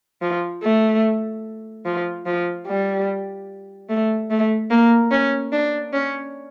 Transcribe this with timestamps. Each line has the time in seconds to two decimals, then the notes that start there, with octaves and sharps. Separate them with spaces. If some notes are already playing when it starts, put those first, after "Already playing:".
0.22 F3
0.63 A3
1.85 F3
2.26 F3
2.67 G3
3.89 A3
4.31 A3
4.70 A#3
5.11 C#4
5.52 D4
5.93 C#4